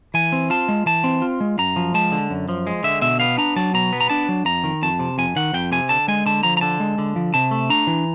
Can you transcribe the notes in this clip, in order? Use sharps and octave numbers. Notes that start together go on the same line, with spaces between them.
E3 G#5
C4
F4 A5
G#3
E3 A5
C4
F4
G#3
F#2 A#5
F3
G#3 A5
D3
F#2
F3
G#3
D3 E5
B2 E5
B3 F5
D4 A#5
F#3 A5
B2 A#5
B3
A#5
D4 A5
F#3
F2 A#5
D#3
F2 A5
C3
F2 G#5
D#3 F#5
F2 G5
C3 G#5
D3 A5
G#3 G#5
D3 A5
F3 A#5
A#5
D3 A5
G#3
D3
F3
C3 A5
A3
D4 A#5
E3